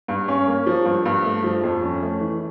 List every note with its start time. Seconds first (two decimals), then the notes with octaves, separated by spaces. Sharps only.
0.08 G2
0.28 C#4
0.47 A#3
0.67 F3
0.85 G2
1.06 G2
1.25 A3
1.44 F3
1.64 F2
1.82 C#4
2.02 A3
2.21 E3